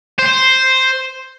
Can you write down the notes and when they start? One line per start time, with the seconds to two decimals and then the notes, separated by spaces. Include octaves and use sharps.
0.19 C5